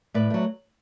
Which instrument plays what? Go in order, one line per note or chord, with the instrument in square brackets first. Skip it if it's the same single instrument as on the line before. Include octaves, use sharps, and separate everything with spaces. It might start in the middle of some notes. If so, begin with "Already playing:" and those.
[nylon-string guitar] A2 B4 D5
F#3 A3